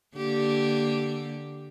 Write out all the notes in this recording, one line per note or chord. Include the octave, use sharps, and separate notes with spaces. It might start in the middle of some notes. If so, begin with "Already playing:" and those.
D3 A#3 G4